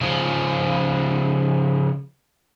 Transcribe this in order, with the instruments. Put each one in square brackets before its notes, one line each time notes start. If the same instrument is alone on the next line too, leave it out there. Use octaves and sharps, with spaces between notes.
[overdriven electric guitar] C#3 F3